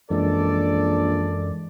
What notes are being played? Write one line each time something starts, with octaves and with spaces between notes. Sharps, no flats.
A#1 F#2 E3 G#3 A4 D5